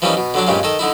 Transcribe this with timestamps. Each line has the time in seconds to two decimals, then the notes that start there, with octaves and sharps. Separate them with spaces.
0.02 E3 F3 G3 A#3 C#4 D#4
0.17 B2
0.34 D3 F#3 D4
0.47 G2 A#2 C#3 G3 G#3
0.63 D#3 A4 D#5
0.79 D3 D#4 E4